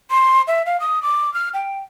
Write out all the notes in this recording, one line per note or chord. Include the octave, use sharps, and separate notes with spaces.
C6
E5
F5
D#6
D6
F6
G5